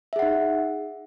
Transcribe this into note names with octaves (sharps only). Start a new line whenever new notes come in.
D#4 G#4 E5 F#5